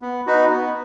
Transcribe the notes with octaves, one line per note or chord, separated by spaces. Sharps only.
B3
D#4 F#4 B4
B3